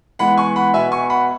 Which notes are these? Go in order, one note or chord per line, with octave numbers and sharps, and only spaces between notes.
E3 G#3 B3 F#5 B5
G#5 C#6
F#5 B5
B2 B3 E5 G#5
G#5 C#6
F#5 B5